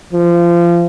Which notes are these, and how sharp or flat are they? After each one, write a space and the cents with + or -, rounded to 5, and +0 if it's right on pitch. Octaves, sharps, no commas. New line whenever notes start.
F3 -25